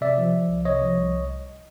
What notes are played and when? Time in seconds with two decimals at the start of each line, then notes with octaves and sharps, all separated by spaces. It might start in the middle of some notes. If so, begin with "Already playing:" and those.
0.01 C3 D5 E5
0.18 F3
0.33 F3
0.49 C2
0.65 C3 C#5 D#5
0.82 F3
0.98 C2